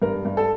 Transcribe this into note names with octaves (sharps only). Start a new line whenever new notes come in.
G2 A#4
G2
A4